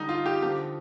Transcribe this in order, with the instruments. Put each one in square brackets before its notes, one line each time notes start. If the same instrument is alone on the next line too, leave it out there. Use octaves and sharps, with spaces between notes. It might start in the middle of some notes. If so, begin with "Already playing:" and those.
Already playing: [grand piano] D3 G3 D#4
F4
G4
D3 F3 G4